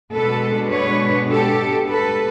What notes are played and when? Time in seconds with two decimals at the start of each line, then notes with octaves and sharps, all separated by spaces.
0.13 B2 G#3 B3 D4 A4 B4
0.72 B4 C#5
1.30 G4 A4
1.88 A4 B4